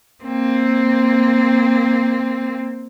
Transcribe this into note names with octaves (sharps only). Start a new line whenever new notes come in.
A#3 C4